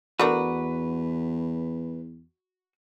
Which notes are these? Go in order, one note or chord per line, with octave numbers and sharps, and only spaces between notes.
E2 A3 D4 F#4 A#4 B4